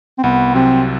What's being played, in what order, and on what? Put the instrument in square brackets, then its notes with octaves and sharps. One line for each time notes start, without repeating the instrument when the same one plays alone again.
[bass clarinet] C4
[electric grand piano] C2 [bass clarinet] B3
[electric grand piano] C3 F#3 [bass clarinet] C4